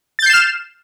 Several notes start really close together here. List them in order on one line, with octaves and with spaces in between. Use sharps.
A6 G6 C7 E7 F6